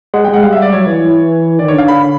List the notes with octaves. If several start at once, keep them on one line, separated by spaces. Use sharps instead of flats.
G#3 F#5
G#3 G5
F#5
G3 F5
E5
D5
F#3 C#5
E3
D#3 D5
D3 C#5
F5
B5